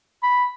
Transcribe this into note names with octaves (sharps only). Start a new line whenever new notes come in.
B5